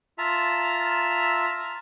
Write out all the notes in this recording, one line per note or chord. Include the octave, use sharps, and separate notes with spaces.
F4 E5 A5 A#5